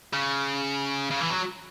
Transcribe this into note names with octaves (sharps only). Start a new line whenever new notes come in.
C#3
C#3
E3
F#3